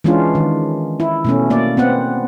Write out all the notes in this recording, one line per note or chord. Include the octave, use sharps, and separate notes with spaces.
E3 G#3 C#4 D4 F4
D#3
E4
B2 A3 C#4
A#3 D5
B3 C4 F#5